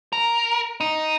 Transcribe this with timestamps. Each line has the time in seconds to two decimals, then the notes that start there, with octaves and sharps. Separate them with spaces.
0.13 A#4
0.81 D#4